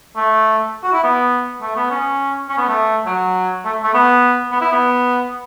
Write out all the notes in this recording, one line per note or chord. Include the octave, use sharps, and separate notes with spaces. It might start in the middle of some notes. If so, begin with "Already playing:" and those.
A3
F#4
E4
B3
A3
B3
C#4
C#4
B3
A3
F#3
A3
A3
B3
B3
E4
B3